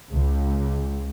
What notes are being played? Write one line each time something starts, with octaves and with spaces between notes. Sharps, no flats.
C#2